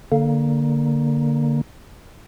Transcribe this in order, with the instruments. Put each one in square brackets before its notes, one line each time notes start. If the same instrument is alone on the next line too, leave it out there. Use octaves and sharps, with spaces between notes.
[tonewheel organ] D3 A#3